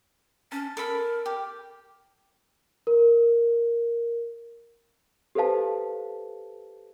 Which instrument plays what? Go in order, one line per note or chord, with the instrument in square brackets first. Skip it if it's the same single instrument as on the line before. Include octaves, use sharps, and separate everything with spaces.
[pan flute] C#4 [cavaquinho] A5
[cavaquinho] A4 B5 [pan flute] A#4
[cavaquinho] G4
[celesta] A#4
G4 A4 B4 C5 F5 A5